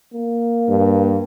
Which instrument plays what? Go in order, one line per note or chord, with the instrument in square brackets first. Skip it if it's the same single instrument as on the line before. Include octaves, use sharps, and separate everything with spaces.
[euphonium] A#3
[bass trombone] G2